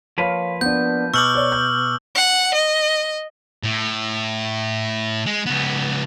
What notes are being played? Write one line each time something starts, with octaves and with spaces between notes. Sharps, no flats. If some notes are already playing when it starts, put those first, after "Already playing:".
F3 A#3 B4 C#5 F5 B5
B3 D4 G6
B2 C#6 D6 E6 F6 G6 F#7
C#5 D5
G6
F#5
D#5
A2
G#3
C#2 B3